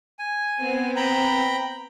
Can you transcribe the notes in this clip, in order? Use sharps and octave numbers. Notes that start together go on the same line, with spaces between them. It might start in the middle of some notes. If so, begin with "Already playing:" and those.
G#5
B3 C4
G5 A#5 B5